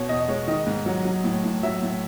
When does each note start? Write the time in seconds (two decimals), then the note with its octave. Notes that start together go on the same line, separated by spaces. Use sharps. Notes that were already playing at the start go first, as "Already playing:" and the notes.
Already playing: B2 C#5
0.09 E2 D#5
0.28 G#3 C#5
0.48 D#3 D#5
0.66 G#2
0.86 F#3
1.05 F#3
1.24 A2
1.44 A2
1.63 F#3 E5
1.82 A2